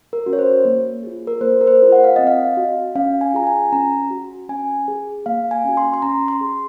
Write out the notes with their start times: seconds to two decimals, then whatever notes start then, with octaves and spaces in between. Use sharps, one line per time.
0.13 A#4
0.26 C#4 F#4
0.33 C#5
0.39 C5
0.65 A#3
1.03 F4 G#4
1.27 A#4
1.41 A#3 C5
1.61 A#4
1.67 C5
1.80 F4 G#4
1.92 F#5
2.04 F5
2.16 C4 D#5
2.27 F5
2.57 F#4
2.95 C#4 F5
3.21 G#5
3.34 F4 G#4 A#5
3.47 G#5
3.72 C#4 A#5
4.10 F#4
4.49 C#4 G#5
4.88 G#4
5.26 A#3 F5
5.51 G#5
5.64 C#4 F#4
5.77 C6
5.94 C6
6.02 C#4 A#5
6.28 C6
6.41 G#4